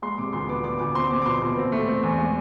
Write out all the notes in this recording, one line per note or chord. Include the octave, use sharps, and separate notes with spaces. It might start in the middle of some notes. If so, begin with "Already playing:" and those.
G#3 C6
C3 D6
D2 C6
B3 D6
B3 D6
D2 D6
C4 C6
C4 D6
D6
B2 C6
B2
C4
A3
C4
E2
G#3